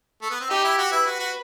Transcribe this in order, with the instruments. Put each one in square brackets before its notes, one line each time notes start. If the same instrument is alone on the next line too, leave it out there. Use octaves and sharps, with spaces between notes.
[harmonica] A3
B3
C4
[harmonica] D#4 [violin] G4
[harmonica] E4
F#4
[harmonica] E4 [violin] B4
[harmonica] F#4
F#4